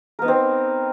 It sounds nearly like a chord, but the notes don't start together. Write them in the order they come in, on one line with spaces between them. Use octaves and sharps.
A#4 B3 D#4 C4